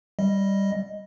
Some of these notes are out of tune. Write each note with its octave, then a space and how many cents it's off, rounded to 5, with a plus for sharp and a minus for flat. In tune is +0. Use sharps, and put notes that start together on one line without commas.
G3 +0 D#5 +5